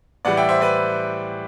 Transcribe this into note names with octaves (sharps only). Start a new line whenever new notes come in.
A2 E3 G3 D5 F#5
E5 G5
C5 E5
B4 D5